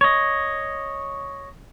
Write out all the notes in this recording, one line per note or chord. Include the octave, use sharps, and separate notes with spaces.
C#5 D#5